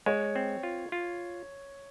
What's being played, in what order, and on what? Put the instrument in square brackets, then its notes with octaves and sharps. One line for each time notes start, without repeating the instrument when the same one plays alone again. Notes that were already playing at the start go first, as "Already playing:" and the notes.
[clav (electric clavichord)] G#3 [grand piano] C#5
[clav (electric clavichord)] C4
F4
F4